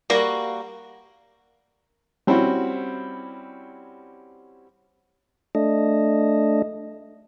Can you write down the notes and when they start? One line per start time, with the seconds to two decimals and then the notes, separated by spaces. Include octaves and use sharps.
0.10 G3 A#3 F#4
2.27 G3 C4 C#4 E4 F#4
5.55 A3 D4 D#5